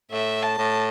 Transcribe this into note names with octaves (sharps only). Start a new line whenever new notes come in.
A2 E5
A5
A2